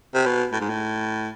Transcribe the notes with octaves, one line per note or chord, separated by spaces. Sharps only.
C3
B2
A2
G#2
A2